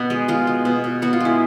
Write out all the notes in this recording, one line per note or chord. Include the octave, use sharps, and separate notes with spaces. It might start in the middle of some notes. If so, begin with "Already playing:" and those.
Already playing: B2 B3
G#3
G#3 F4
G#3
B2
B2
B3 F#4
F4
G#3 E4